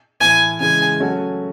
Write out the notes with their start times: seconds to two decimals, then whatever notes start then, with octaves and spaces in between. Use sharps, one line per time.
0.20 A2 E3 A3 G#5
0.60 C#3 E3 G#3 G#5
1.00 F#3 A3 C#4 F#4 A4